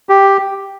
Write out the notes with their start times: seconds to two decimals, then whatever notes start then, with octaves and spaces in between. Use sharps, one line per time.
0.09 G4